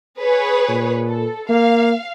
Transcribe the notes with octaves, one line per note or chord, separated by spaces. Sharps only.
G#4 B4 C#5
A#2
A4
A#3 F5